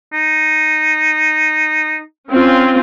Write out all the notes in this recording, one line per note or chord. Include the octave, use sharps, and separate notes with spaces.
D#4
C4 C#4 F4